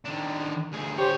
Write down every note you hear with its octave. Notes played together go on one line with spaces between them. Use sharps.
D#3 D4
D2 G#4
D3 G4 C5 C#5